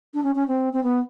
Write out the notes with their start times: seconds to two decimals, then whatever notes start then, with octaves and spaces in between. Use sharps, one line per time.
0.14 D4
0.23 C#4
0.35 C#4
0.48 C4
0.73 C4
0.83 B3